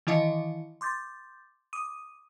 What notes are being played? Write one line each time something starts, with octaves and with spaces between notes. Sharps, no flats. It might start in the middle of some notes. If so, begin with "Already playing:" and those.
D#3 E3 E4 D#5 F5 C#7
C6 D6 G6 A6
D6 D#6 D#7